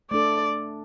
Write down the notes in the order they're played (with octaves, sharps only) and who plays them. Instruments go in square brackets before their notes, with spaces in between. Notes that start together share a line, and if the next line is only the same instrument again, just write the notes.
[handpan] A3 D4 A4 [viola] D5